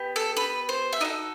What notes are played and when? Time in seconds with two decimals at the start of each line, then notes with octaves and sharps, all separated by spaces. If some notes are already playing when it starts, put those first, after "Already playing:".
Already playing: B3 G4
0.16 A4
0.37 B4
0.69 C5
0.93 E5
1.00 D#4 F#4 A4 D#5